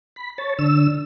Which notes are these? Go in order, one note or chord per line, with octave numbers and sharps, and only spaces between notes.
B5
C#5 A5
D3 E6